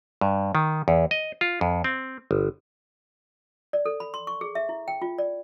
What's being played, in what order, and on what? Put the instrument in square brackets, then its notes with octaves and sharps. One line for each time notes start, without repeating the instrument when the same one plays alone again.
[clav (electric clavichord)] G2
D#3
E2
D#5
F4
F2
C4
G1
[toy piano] D5
A4
B5
C6
C#6
G#4
E5
E4
G5
F4
D5